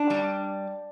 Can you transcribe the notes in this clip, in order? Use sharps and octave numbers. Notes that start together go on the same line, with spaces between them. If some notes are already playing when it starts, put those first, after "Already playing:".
Already playing: D4
G3